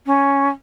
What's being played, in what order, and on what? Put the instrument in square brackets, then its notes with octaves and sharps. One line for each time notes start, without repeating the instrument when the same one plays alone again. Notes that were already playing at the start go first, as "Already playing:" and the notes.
[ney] C#4